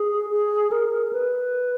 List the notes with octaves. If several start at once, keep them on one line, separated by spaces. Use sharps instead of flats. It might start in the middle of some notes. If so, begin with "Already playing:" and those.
Already playing: G#4
G#4
A#4
B4